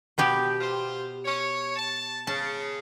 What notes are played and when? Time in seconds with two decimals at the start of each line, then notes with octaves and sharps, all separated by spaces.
0.18 B2 B3 G4
0.61 F4 C5
1.25 C#5
1.76 A5
2.27 C#3 A5